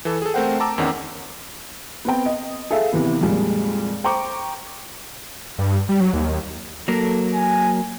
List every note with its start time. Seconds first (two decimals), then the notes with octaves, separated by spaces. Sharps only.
0.05 E3 A4
0.22 G#4 A4
0.34 A3 C4 A#4 C5 F#5 G5
0.60 A5 A#5 D6 E6
0.78 E2 D#3 C#4 F#5
2.05 B3 C4 G5
2.26 D#5
2.71 G#4 A4 E5 F5
2.92 C3 E3 B3
3.21 F2 A#2 G3 G#3
4.04 C5 G5 A#5 C#6 D6
5.58 G2
5.89 G3
6.00 F#3
6.13 D#2
6.88 F#3 A#3 A4 A#4
7.34 G#5